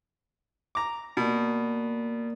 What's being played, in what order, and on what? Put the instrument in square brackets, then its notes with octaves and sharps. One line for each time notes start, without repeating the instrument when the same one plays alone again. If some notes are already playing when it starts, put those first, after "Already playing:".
[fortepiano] A#5 D6
[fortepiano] B2 [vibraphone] A#3 A#4 D5